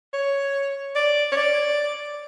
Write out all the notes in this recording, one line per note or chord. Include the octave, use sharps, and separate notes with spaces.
C#5
D5
C#5
D5